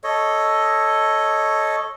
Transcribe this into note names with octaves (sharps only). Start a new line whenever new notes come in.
A4 C#5 D#5